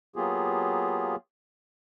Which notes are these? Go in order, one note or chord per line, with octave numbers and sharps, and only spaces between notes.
F#3 A#3 B3 F4 G4 G#4